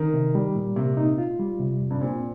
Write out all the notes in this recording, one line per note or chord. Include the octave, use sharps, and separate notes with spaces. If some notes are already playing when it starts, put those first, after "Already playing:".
Already playing: D#3 A#4
C3
G3
A#2
C3 A#3
D#4
F4
G3
C3
F2
G2
A#2 C4